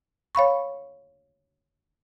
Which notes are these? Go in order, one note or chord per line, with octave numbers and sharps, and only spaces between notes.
C#5 F5 B5 C#6